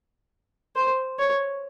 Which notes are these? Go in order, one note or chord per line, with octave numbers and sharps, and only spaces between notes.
C5
C#5